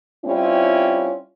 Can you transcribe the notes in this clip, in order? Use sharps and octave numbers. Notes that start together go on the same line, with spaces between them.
G3 C4 C#4 E4 F4